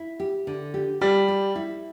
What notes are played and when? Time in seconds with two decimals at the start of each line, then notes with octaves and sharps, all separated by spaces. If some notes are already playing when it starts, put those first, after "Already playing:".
Already playing: E4
0.20 G4
0.47 D3
0.74 G4
1.01 G3 G4
1.28 G4
1.56 E4